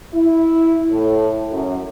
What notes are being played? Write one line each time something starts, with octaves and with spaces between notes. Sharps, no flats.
E4
A2
F#2